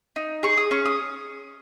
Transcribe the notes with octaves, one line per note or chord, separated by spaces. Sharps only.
D#4
G#4 C#6
D#6
C#4 C#6
D#6